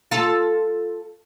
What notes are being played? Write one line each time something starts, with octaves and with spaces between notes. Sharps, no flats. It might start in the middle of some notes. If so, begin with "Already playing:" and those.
F4 A4